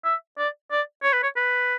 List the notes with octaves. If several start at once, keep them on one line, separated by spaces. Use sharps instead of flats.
E5
D5
D5
C#5
B4
C#5
B4